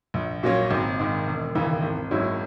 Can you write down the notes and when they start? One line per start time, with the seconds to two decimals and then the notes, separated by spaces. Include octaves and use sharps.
0.14 A#1
0.43 A#2 F#3 A#3 C#4
0.71 G#1
0.99 G#2 D#3
1.27 E1
1.55 D#2 C#3 E3
1.83 G#1
2.11 G#2 F#3 C#4 E4